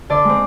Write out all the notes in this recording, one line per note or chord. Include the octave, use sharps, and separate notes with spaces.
D3 D5
G#3 C4